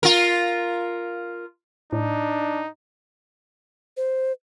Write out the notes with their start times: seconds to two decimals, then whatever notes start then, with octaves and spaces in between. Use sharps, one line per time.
0.03 F4 A#4
1.92 A2 D4 D#4
3.97 C5